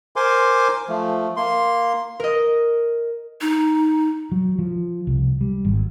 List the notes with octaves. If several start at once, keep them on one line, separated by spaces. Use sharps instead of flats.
A#4 C5 G#5 C6 D6
F3 A3
A#3 C6
A#4 D#5
D#4
F#3
F3
C2
G3
G#1